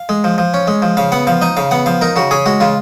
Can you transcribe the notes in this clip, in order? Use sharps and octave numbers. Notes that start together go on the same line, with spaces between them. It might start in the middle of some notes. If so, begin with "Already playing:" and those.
Already playing: F5
G#3
F3
F3
C#4
G#3
F3
C#3 F5
B3 F#5
F3 F5
D#4 D#5
C#3 F5
B3 F#5
F3 F5
D#4 A#4
C#3 F#4
C#4 G#4
G#3 F#4
C#3 F4